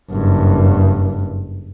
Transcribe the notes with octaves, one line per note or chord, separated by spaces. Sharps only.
F#1 G2